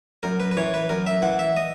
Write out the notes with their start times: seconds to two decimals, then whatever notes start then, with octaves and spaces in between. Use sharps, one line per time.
0.23 F#2 A#4
0.40 B4
0.51 B4
0.57 E3 C#5
0.74 B4
0.89 F#2 A#4
1.06 E5
1.22 E3 F#5
1.39 E5
1.57 D#5